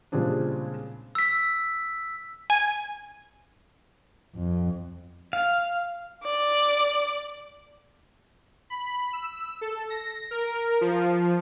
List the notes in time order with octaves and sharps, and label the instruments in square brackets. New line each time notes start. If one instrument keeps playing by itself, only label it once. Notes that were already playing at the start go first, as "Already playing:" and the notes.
[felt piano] A#2 C#3 G3 G#3 C4 D4
[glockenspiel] E6 B6
[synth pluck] G#5
[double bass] F2
[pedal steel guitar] F5
[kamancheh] D5
[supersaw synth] B5
E6
A4
A#6
A#4
F3